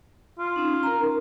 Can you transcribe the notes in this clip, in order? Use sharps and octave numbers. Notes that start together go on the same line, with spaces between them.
F4
C#4 D#4
A#4 A#5